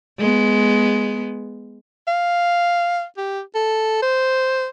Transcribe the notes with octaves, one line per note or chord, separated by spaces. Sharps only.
G#3 B3
F5
G4
A4
C5